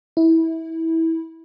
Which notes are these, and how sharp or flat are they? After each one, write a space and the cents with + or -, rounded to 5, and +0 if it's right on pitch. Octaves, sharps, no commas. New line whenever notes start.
E4 -20